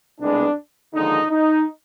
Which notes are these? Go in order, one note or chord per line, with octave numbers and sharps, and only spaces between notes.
C2 B2 G#3 B3 D4
D#2 D3 F3 G#3 D#4
D#4